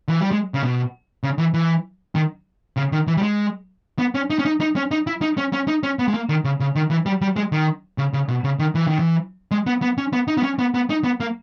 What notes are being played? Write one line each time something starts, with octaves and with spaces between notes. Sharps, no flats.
E3
G3
G#3
C#3
B2
C#3
E3
E3
D#3
C#3
D#3
E3
G3
G#3
B3
C#4
D#4
C#4
D#4
D#4
C#4
D#4
E4
D#4
C#4
C#4
D#4
C#4
B3
G#3
A#3
D#3
C#3
C#3
D#3
E3
G3
G3
G#3
D#3
C#3
C#3
B2
C#3
D#3
E3
D#3
E3
G#3
B3
B3
C#4
B3
D#4
B3
C#4
B3
B3
D#4
B3
A#3